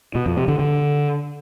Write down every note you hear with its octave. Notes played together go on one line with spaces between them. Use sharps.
B2
F2
C3
D3
D3